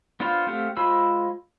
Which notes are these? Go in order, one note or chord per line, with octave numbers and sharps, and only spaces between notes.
B3 D4 F4 C5 F5
A3 C4 G4 F5 F#5
G#3 F4 C5 B5 E6